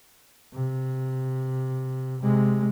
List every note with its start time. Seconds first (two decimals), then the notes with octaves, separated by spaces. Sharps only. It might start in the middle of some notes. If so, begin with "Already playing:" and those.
0.53 C3
2.21 C3 G#3